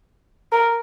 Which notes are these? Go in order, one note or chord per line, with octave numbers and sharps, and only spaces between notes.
A#4